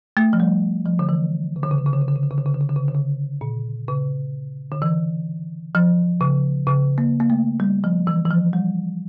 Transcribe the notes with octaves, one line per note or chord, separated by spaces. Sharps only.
A3
F3
G3
F3
D3
E3
C#3
D3
C#3
D3
C#3
D3
C#3
D3
C#3
D3
C#3
D3
C#3
D3
C#3
D3
C#3
D3
C#3
A#2
C#3
D3
E3
F3
C#3
C#3
A#3
A#3
A3
G3
F3
E3
E3
F3
G3